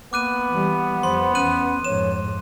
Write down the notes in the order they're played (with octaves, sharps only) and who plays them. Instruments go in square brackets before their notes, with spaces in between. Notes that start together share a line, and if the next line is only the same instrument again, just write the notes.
[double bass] A#3 [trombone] B3 [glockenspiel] D6 F#6 D#7
[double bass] E3 G3
[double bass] F2 G3 [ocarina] C5 [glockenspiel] C6
[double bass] E2 [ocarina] C#4 [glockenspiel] F#6 D#7 F#7
[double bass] F2 G#2 [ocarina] C#5 [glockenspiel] E7